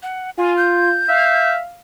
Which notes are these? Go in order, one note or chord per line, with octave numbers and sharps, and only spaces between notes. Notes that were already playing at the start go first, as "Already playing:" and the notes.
F#5
F4 G#5
G6
E5 F5